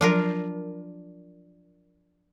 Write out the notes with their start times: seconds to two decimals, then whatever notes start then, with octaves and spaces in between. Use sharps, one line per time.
0.01 F3 F#3 D4 F4 A#4